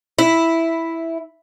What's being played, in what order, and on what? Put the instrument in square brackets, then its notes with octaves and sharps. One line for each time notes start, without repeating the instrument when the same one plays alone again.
[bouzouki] E4